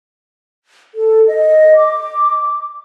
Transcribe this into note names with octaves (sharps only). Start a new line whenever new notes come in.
A4
D#5
D6